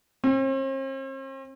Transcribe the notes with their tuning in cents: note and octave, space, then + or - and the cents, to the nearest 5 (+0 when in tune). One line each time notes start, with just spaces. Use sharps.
C4 +45